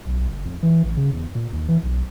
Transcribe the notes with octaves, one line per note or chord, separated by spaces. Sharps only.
B1
F#1
F2
E3
A1
C#3
E2
A#2
D#2
E3
B1